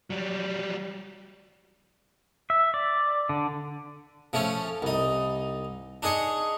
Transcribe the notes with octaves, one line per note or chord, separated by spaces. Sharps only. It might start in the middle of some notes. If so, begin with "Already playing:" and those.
F#3 G3
E5
D5
D3
F3 A3 C#4 A4
C2 D#4
D4 D#4 G#4 C#6